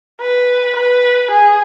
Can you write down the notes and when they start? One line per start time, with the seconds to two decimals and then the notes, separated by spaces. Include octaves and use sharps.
0.21 B4
0.76 B4
1.31 G#4